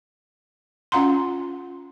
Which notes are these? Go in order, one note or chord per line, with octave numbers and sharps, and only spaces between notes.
C#4 F4 F5 F#5 A#5 C6